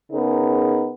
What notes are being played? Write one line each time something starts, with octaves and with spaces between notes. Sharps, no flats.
C#3 B3 D#4 G#4 A#4